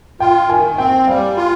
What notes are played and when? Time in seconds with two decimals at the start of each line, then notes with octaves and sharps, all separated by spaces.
0.20 F4 G5
0.49 D#3 G#5
0.78 C4 G5
1.08 G3 F5
1.37 F4